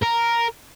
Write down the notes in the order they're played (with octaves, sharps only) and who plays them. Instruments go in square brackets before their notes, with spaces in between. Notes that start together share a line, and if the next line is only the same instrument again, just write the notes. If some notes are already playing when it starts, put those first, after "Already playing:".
[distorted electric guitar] A#4